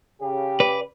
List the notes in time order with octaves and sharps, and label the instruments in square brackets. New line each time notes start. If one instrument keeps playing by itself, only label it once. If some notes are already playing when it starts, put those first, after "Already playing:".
[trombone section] C#3 G4
[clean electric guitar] B4 D5